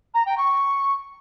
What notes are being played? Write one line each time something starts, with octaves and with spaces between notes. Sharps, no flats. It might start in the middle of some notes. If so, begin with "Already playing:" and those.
A#5
G5
C#6